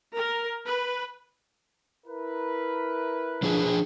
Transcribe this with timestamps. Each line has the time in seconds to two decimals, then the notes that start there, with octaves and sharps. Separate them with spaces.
0.12 A#4
0.65 B4
2.07 E4 A#4 B4
3.43 F3 D4 G#4